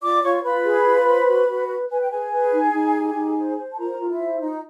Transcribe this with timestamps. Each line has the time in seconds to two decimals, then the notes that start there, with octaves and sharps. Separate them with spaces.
0.02 F4 D5 D6
0.23 F4 C#5 C#6
0.43 F4 B4 B5
0.64 G#4
0.85 F4
1.07 C5
1.27 F#4
1.48 F#4
1.68 B4
1.90 B4 G#5
2.00 G5
2.10 G#4 B4 G#5
2.31 B4
2.52 D#4
2.73 D#4
2.95 G4
3.15 D#4
3.37 C5
3.58 C5
3.72 A5
3.78 F4 A#4 A#5
3.98 F4
4.09 E4 E5
4.20 C5
4.40 D#4 F4 D#5